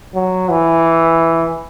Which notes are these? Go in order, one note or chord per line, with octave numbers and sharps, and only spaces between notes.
F#3
E3